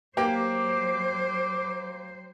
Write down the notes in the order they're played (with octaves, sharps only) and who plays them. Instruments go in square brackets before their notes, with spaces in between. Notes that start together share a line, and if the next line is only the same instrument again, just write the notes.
[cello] F#3 C5 [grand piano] A#3 G4 [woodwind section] D6